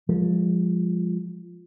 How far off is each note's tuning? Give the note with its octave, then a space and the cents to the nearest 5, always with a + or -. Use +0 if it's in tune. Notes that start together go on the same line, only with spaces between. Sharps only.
F3 +10 G#3 -20